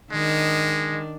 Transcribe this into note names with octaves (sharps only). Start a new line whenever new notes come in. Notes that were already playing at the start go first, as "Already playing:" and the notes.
D#3 G#3 D4